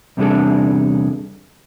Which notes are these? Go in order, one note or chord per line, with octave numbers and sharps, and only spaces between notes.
E2 C3 G3 D4 G#4 A4